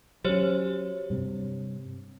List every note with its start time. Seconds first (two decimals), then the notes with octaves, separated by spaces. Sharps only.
0.25 F#3 C#4 G4 C5 C#5
1.10 G2 C3